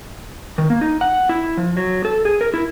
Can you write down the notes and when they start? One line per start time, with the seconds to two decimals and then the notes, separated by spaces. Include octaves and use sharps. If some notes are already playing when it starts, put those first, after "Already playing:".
0.58 D#3
0.70 A#3
0.81 D#4
1.01 F#5
1.29 E4
1.57 F3
1.77 F#3
2.05 A4
2.25 G#4
2.41 A#4
2.54 E4